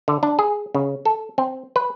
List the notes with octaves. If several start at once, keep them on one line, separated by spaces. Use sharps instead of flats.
D3
D4
G#4
C#3
A4
C4
B4